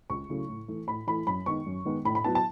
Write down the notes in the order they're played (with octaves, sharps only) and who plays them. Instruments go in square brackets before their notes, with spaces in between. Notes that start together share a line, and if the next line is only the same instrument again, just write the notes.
[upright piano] C#2 C#6
C#3 F#3 A3 E4
A2
E3 A3 E4
A2 B5
E3 A3 E4 B5
F#2 B5
D#3 G#3 B3 C#6
F#2
D#3 G#3 B3
A2 B5
B5
F#3 B3 E4 A5
A5